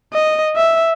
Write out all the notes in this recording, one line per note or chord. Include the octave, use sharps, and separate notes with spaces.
D#5
E5